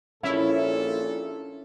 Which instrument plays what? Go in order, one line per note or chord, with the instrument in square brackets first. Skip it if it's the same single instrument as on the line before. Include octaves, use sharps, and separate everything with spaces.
[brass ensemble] A#1 A#2 A4 [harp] C#4 [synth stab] E4